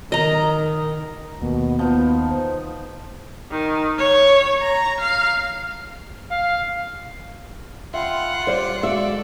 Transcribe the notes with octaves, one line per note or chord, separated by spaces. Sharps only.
D#3 D#5 A#5
D#2 B2 A#3
F3 B3 D#4
C5
D#3
C#5
A#5
F5
F5
F4 E5 F#5 G5 B5
G3 C5 D5
G#3 F#4 A4 D5 E5 F5